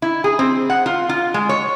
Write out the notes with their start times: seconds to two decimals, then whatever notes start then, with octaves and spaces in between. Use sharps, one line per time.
0.02 E4
0.24 G#4
0.39 C4
0.70 F#5
0.86 F4
1.09 F4
1.34 G#3
1.49 C#5